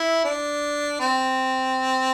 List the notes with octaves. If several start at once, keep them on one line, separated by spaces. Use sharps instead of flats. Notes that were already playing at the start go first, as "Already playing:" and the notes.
Already playing: E4
D4
C4